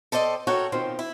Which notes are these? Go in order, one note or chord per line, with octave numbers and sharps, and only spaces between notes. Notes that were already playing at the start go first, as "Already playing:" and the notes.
A4 C5 D5 D#5 G5
F#4 A4 A#4 C#5 F#5 G5
B2 D#3 F3 C4
E4